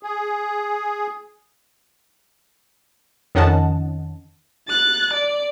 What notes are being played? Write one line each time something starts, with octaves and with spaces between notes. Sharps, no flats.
G#4
F2 D#3 C#4 D#5 F#5 A5
F#6 A6
D5